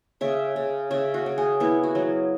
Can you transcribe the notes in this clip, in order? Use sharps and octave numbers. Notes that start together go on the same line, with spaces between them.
C#3 E5
C#3
C#3 E5
F#4
C#3
G#4
B3 E4
F#4
F#3